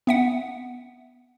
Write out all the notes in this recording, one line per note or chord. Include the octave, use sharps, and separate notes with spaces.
B3 E5 F#5